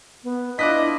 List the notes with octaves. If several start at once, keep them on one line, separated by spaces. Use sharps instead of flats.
B3
D4 E4 F4 D#5 D6 F#6 B6